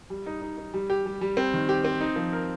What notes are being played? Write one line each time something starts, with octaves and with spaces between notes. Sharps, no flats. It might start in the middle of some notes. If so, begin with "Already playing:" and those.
G3
D#4
D#4
D#4
G3
G4
G3
G3
C4
D#3
G4
C4
D#4
F3
A#4